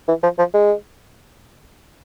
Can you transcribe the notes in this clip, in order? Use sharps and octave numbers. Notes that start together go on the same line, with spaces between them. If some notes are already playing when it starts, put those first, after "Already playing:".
E3
F3
F3
G#3